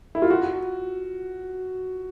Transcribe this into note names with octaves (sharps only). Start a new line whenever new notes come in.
E4
F4
F#4